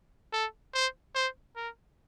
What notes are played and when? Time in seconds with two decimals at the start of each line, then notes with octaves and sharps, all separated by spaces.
0.33 A4
0.74 C5
1.15 C5
1.56 A#4